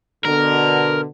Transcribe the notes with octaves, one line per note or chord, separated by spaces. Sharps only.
B2 D3 A#4